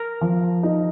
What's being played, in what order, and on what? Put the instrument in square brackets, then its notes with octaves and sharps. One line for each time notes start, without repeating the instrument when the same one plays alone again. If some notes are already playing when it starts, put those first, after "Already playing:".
Already playing: [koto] A#4
[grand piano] F3
D#4